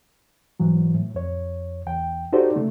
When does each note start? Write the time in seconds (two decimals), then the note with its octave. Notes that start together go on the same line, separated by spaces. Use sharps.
0.60 G#2 E3 F#3
0.94 A2
1.14 F2 C#5
1.87 E2 G5
2.33 D#4 F#4 G4 A4 C5 D5
2.56 C#3 A3